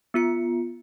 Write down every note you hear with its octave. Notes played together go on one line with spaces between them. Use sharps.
B3 F4 C#7